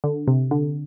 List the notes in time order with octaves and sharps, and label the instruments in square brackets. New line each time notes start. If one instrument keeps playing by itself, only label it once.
[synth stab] D3
C3
D3